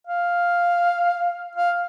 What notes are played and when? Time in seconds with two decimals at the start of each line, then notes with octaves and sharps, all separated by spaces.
0.07 F5
1.56 F5